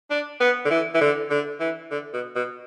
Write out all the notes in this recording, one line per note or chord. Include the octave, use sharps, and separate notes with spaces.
D4
B3
D3
E3
E3
D3
D3
E3
D3
B2
B2